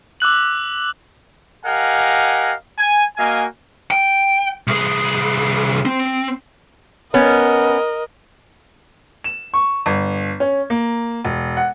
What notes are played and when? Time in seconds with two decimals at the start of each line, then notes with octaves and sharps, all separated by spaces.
0.20 D6 E6 F#6 F#7
1.65 G4 A#4 D#5 F5 F#5 G#5
2.78 G#5
3.17 A#3 F#4 D#5 F5 G#5
3.91 G5
4.67 C2 G#4
5.85 C4
7.14 B3 C#4 A#4 D#5
9.24 E7
9.54 C#6
9.86 G1
10.40 C#4
10.70 A#3
11.25 E1
11.57 F#5